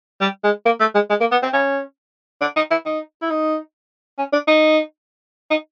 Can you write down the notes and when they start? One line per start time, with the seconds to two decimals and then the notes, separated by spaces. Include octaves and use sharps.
0.21 G3
0.43 G#3
0.66 A#3
0.80 A3
0.95 G#3
1.10 G#3
1.20 A#3
1.31 B3
1.43 C4
1.53 C#4
2.41 D4
2.56 D#4
2.71 E4
2.86 D#4
3.22 E4
3.30 D#4
4.18 C#4
4.33 D4
4.47 D#4
5.50 D#4